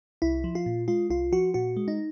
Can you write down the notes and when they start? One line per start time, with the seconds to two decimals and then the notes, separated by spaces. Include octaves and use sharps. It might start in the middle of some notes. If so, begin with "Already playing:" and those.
0.22 C2 E4
0.44 F3
0.55 F4
0.66 A#2
0.88 G#3 F4
1.10 C2 F4
1.32 F3 F#4
1.54 A#2 F#4
1.77 G#3
1.88 D#4